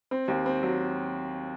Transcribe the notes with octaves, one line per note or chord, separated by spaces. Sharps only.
C4
D#2
C4
F#3